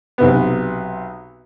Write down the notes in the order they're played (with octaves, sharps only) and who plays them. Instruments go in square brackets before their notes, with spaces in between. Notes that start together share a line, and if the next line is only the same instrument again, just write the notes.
[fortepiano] B1 C3 B3